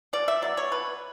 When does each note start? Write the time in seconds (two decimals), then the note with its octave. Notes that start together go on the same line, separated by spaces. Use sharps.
0.13 B2 D5
0.28 E5
0.42 F#3 B3 D5
0.57 C#5
0.72 B2 B4